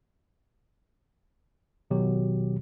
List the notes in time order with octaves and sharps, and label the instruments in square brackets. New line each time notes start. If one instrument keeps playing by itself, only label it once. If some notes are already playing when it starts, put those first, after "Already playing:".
[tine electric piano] G#1 B2 D#3 F#3 G4